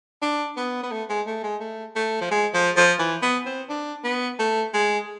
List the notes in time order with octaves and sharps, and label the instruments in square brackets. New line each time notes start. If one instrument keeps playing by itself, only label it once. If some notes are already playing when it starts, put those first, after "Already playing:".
[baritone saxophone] D4
B3
B3
A3
G#3
A3
G#3
A3
A3
F3
G#3
F3
F3
E3
B3
C4
D4
B3
A3
G#3